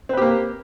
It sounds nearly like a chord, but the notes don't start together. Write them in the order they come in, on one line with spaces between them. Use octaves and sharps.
C4 B4 G4 A#3